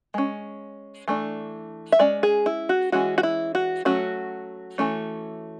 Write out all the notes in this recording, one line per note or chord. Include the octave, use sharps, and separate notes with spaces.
G#3 C#4
E3 A3 D4
E5
G#3 C#4 D5
G#4
E4
F#4
E3 G#3 C#4 F#4
F#4
E4
F#4
F#3 A3 C#4 F#4
E3 A3 C#4